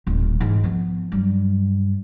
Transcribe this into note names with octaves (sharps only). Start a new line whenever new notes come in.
D#1 A1
G#2 E3
F3 B3
G2 F#3